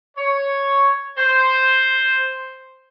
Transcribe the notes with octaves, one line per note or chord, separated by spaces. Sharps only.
C#5
C5